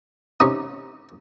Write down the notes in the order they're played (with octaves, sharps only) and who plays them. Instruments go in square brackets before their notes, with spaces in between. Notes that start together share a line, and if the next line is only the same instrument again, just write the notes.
[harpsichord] C3 C#4 D#4 D#6